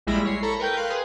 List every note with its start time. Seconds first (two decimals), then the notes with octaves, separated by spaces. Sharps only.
0.07 A#1 G3 G#3 E4 B5 A#6
0.25 C#5 C7
0.42 A4 A#5 B5 C#6
0.59 A#4 B4 G5 G6
0.77 F5 C6 F#6
0.90 G#4 B4